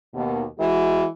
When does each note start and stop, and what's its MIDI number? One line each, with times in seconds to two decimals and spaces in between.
0.14 0.42 39
0.14 0.42 47
0.59 1.05 52
0.59 1.05 56
0.59 1.05 66